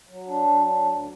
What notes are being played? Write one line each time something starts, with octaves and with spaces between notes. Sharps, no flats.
F#3
D4
F#3
D4
D2